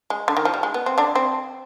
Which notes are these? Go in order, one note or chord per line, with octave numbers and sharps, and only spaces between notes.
G#3
D3
D#3
F3
G3
G#3
B3
C4
D3 D4
C4